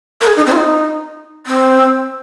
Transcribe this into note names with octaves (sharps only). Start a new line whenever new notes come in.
A#4
G#4
D#4
C4
F4
D#4
C4